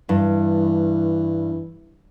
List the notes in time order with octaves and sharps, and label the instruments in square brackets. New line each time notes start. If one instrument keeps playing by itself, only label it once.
[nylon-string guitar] G2 [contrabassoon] E3